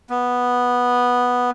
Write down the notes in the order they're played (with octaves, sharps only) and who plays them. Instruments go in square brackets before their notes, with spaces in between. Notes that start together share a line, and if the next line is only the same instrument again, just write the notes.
[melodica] B3